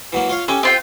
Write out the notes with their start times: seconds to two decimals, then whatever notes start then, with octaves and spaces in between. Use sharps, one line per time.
0.13 E3 F#3 A#3
0.29 F4 C#5 F5
0.48 C#4 G4 A4
0.63 C4 F4 G5